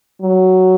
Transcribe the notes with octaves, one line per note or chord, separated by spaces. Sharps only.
F#3